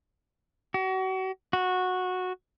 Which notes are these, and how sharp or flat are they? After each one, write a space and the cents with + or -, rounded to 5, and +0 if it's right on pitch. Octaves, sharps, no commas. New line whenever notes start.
F#4 +35
F#4 -15